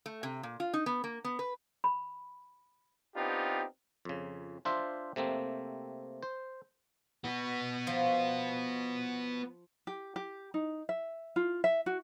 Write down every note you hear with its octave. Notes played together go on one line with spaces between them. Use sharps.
A3
C3
A#2
F4
D#4
B3
A#3
B3
B4
B5
B3 C4 D4 D#4 F4 G4
F2 C#3
D4 F4 C5 E5
C3 A3 A#3 C4
C5
B3 F#4
F3
G4
G4
D#4
E5
F4
E5
F#4